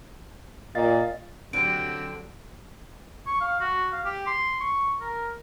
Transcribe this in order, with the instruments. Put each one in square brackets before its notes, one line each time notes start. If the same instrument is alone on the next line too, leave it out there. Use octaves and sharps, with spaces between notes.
[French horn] A#2 [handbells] D#5 F5 A6
[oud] D3 [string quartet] F#3 F#4 G4 [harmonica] C4 D4 [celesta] D7
[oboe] C#6
F5
F#4
F5
G4
C6
C#6
A#4